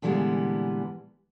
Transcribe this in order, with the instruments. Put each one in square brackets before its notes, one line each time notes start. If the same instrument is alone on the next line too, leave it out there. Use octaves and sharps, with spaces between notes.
[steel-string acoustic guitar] A#2 D3 E3 G3 G#3 B3